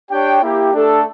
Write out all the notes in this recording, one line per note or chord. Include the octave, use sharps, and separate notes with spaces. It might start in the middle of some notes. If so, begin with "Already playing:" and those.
D4 G4 C#5 G5
A#3 E4 G4
A3 D4 A4